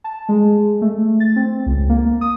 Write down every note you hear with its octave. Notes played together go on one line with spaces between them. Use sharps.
A5
G#3
A3
A6
C4
C#2
A#3
D#6